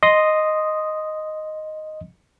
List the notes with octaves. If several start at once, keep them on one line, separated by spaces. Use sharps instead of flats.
D#5 C6 D#6